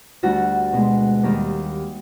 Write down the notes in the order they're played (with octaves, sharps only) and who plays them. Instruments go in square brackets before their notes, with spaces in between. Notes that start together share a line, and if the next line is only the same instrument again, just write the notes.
[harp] D2 D3 G3 F#4
B2 G#3
D#2 D#3 G3 A#3